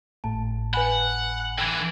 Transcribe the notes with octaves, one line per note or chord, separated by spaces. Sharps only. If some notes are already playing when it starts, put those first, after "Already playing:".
G#1 A2 A5
B4 F#5 G#5 B5
D3 E3 G5 G#6